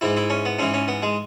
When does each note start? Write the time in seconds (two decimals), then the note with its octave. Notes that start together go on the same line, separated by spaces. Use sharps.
0.01 G#2 E3 E4
0.17 E4
0.30 C#4
0.45 B3
0.59 G#2 E3 C#4
0.74 C#4
0.88 B3
1.02 G#3